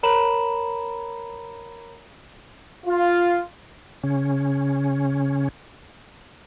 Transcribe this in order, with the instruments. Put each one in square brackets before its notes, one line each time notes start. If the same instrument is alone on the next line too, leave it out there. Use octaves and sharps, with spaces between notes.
[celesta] A#4 C#5 A#5 B5 E7 F#7
[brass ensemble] F4
[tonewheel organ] C#3 C#4